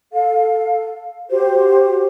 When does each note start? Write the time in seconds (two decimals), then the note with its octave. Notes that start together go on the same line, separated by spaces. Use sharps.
0.13 A4 F5
1.31 F#4 G4 C5